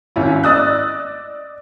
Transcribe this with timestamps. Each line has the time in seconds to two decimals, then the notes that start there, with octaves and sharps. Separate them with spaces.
0.16 G#1 C#4 E4
0.43 D5 D#5 D#6 E6 F#6